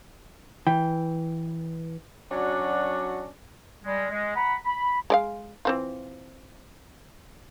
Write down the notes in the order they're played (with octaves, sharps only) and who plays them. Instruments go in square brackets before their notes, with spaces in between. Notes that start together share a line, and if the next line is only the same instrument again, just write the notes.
[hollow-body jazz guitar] E3 [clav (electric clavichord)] G5
[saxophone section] F#3 C#4 D4 F#4 D5
[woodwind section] G3 G#3
G#3
F#5 A#5 B5
B5
[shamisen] G#3 D5 F5
E3 C4 F4